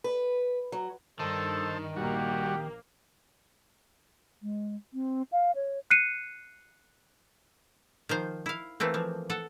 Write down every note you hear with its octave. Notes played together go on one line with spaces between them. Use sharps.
B4
F#3
G2 D#3 A4 C5 A5
A#1 G3 A#3 F#4 G4
G#3
C4
F5
C#5
F#6 C7 C#7 D#7
D#3 F3 C5
E4 F5
E3 A3 A#3 C4
E3 F3
A4 F#5